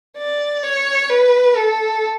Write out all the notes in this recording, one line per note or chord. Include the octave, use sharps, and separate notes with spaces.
D5
C#5
B4
A4